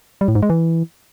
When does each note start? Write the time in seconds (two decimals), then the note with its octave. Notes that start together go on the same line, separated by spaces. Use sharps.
0.21 G3
0.28 A2
0.35 G#2
0.43 G#3
0.50 E3